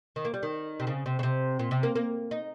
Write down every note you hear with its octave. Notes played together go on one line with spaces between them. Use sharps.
D#3
A#3
G3
D#3
C3
C#3
C3
C#3
C3
A#2
C3
A#3
A#3
D#4